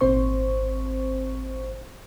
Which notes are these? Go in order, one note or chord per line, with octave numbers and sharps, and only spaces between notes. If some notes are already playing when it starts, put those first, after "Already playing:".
G#1 A#2 C4 C5 C#6